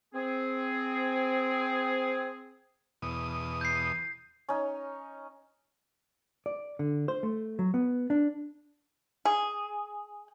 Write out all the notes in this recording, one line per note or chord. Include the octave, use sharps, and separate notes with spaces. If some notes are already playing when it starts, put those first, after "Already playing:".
C4 G#4
E2 B2 D#6
G6 C7
C#4 D#4
D5
D3
C5
A3
F#3
B3
D4
G#4